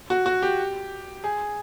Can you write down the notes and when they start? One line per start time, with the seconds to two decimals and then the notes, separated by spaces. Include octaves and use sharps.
0.10 F#4
0.26 F#4
0.42 G4
1.24 G#4